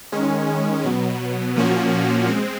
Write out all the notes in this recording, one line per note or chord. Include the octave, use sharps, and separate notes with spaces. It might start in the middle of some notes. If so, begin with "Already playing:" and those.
D#3 G#3 C#4
B2 F#3 B3
A#2 F3 A#3 C#4 F#4
G#3 C4